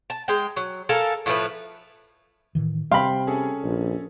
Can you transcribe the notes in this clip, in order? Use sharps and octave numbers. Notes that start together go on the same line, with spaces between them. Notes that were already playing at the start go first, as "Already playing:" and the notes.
A5
G#3 G5
F#3
A4 A#4 F5 G#5
A2 F3 A3 B4
A2 D#3 E3
C3 G3 F5 G5 B5 C6
C#4 G#4 A4
A#1